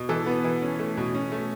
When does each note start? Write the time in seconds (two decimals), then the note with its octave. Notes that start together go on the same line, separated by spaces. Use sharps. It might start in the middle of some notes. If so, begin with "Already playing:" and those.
Already playing: B2
0.09 E3 A4
0.26 B3
0.44 E3
0.62 C#4
0.79 A3
0.97 B2
1.14 C#4
1.32 A3